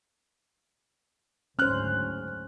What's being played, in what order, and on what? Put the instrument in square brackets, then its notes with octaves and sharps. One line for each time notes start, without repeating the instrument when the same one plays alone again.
[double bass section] F#1 D2 G#2 [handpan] C#4 C5 [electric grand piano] F6 F#6